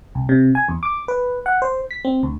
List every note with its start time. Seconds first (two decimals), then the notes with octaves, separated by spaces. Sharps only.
0.15 C2
0.29 C3
0.55 G#5
0.68 E2
0.83 D6
1.08 B4
1.46 F#5
1.62 C5
1.91 B6
2.05 C4
2.23 D2